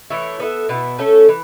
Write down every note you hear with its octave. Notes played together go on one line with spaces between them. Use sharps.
E3 A3 E4 C#5
B3 A4 E5
B2 B3 E4
A3 C#4 A4
E3